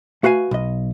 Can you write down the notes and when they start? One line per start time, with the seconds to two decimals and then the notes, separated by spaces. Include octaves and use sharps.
0.23 A3 F#4 B4 F5 G#5
0.51 B1 D#5